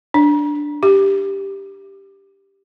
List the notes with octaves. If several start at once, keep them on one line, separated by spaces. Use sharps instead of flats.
D4
G4